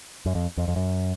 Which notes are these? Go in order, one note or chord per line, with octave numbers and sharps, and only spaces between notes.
F#2
F2
F2
F2
F#2